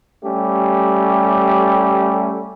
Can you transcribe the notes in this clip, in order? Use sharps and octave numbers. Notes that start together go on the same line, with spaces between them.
G3 A3 C#4 G4